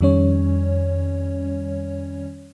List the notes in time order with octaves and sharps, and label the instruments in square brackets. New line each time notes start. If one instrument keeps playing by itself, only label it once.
[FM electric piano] F2 D#3 G3 C#4 C#5